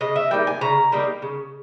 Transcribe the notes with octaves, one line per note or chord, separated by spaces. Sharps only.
C#3 D#5
E5
G3 A#3 D#4 G5
G#5
C#3 A#5
G3 A#3 D#4
C#3